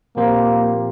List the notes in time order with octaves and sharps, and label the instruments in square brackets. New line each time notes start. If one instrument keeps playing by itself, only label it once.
[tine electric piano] A#2 F3 C4 G4 C5 [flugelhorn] A#3